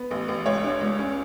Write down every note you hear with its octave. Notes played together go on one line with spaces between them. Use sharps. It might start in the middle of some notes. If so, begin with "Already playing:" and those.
Already playing: B3
A1
A1
C#2 C#5
D4
C#2
C#4